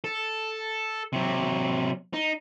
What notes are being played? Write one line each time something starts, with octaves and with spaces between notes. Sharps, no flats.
A4
C3 F#3
D#4